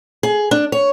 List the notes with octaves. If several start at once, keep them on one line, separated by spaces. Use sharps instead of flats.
G#4
D4
C#5